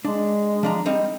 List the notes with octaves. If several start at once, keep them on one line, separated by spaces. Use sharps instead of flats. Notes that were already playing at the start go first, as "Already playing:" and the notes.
G#3 D4
F3 D4 A#5
G3 C4 D#4